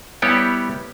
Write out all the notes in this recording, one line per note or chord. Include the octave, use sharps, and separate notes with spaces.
G3 B3 E4 G4 C#5